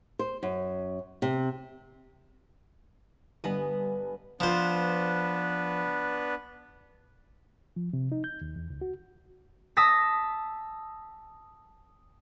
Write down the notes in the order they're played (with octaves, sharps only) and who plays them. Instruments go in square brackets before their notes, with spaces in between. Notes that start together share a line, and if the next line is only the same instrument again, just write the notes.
[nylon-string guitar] C5
F#2
C3
[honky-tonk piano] G2 D3 G#5 [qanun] B3 B4 D#5
[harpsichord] F3 C5 [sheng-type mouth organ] B3 D4 B4
[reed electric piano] F3
C3
D#4
G6
D#2
E2
C#2
F#4
[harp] A5 D#6 E6 A#6 B6